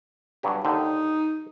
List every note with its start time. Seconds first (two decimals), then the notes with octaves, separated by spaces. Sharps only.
0.43 G2 F#3 G4
0.65 D#2 D3 D#4 G5